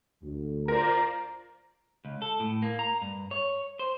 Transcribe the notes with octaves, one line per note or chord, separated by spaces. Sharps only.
D2
F4 A#4 C5 D5 A#5
C#2
A4
A2
A#3
A#5
G2
C#5
C5